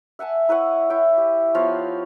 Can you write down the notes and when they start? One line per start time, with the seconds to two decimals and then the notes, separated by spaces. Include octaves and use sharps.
0.19 E5 F#5 G#5 A5
0.49 E4 B4 C#5 F#5
0.90 E4 C#5 G5
1.18 G4
1.55 F3 B3 C#5 F5